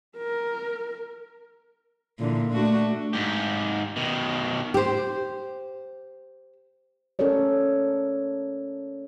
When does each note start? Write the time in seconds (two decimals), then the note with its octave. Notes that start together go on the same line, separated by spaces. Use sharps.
0.17 A#4
2.19 A#2 D3 E3
2.51 A3 D4 F#4
3.13 G#2 G4
3.96 B2 D#3
4.74 G4 C5
7.19 C#4 A4 A#4 C#5 D5